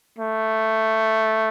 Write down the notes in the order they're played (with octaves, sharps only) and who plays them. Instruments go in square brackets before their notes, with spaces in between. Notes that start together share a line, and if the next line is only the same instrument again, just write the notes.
[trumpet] A3